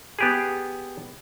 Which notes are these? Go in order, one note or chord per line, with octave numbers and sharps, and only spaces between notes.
B3 G4 G#4